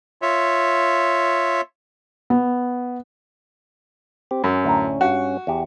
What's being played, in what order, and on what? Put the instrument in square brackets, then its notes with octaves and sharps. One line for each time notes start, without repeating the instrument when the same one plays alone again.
[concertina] F4 C#5 E5
[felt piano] B3
[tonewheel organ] C4 G4
[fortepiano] F#2 [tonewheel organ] C#4
[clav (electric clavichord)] D2 A2 A#5
[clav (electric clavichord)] G2 [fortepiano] F#4
[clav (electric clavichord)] E2 G4